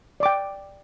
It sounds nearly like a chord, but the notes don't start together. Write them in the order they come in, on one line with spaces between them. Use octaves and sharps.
D5 D6 G5